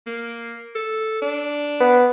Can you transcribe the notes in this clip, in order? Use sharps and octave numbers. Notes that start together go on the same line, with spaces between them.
A#3
A4
D4
B3